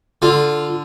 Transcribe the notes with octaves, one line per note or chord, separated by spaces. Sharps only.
D3 F4